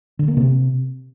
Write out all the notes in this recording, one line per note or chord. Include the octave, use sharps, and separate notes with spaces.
D3
A#3
C3